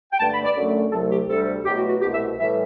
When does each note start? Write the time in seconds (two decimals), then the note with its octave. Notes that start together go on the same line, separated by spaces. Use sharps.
0.12 G5
0.19 G2 D3 A3 A5
0.32 B5
0.44 D5
0.56 F#2 D3 F#3 A3
0.92 C2 C3 F#3 A3 A4
1.11 G4
1.29 D2 C3 G3 A4
1.65 E2 B2 F#3 A3 G4
1.78 F#4
1.89 F#4
2.01 C2 B2 A3 G4
2.14 E5
2.39 A2 E3 G3 E5